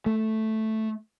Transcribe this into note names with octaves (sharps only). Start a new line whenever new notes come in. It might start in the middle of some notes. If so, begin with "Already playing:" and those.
A3